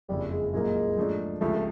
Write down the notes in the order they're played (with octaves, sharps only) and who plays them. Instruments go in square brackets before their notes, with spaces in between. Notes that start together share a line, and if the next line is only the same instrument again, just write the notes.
[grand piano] F#1 F2 C#3 [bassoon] G3
[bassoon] G#3
[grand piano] C2 A#2 F#3 A#3 D#4 [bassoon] G#3
[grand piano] G#2 F3 A3 D4
[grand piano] C#2 C3 F3 [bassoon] A3
[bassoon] A3